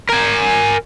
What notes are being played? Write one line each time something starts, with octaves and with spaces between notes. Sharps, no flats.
A#4 G#5